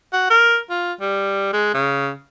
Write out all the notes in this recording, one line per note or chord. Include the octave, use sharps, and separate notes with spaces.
F#4
A#4
F4
G3
G#3
C#3